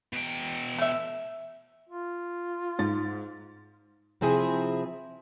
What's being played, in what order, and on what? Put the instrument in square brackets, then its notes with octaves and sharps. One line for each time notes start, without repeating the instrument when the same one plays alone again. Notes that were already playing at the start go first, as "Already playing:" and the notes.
[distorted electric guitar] B2 G5
[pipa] A3 E5
[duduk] F4
[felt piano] G#2 A6
[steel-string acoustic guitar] C3 F3 C4 E4 G#4